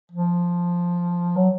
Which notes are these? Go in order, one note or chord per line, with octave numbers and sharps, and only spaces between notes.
F3
F#3